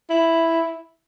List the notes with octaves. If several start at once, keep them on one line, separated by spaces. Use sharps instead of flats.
E4